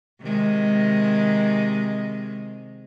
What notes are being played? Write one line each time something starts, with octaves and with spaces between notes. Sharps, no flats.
C3 D#3 G#3